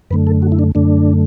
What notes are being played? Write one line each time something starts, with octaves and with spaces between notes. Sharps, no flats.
F#2 D3 A3 B4
A4
F#4
E4
D4
F#2 D3 A3 D4